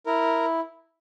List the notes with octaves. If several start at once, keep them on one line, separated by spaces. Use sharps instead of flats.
E4 A#4